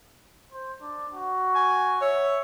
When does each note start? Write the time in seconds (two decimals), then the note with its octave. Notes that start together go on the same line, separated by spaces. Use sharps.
0.52 C5
0.82 D4
1.14 F#4
1.55 G#5
2.01 C#5 E5